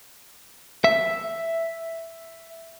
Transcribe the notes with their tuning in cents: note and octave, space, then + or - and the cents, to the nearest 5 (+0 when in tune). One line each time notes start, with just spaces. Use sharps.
E5 +0